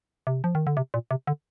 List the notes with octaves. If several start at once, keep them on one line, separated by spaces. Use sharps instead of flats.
C3
F3
D#3
D3
C3
A#2
C3
D3